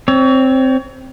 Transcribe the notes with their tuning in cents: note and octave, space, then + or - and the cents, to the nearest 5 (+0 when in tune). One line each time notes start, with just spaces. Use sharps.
C4 +0 C#5 +30